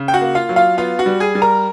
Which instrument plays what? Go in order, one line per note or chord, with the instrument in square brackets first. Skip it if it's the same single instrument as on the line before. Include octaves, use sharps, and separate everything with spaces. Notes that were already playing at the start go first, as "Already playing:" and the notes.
Already playing: [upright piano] C#3
G5
F#4 F#5
A#3
F4 F5
F#3
F4 F5
B3 F4 F5
F#4 F#5
G3
G#4 G#5
G3
A#4 A#5